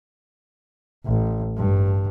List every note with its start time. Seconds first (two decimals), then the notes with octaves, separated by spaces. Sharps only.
1.05 A1
1.57 G2